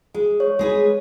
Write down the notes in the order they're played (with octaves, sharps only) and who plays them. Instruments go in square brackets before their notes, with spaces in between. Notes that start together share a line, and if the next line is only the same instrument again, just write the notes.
[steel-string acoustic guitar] G#3
[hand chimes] C#5
[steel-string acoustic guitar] G#3 G#4 B4